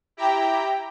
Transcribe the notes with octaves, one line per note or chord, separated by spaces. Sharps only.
E4 G4 G5 A#5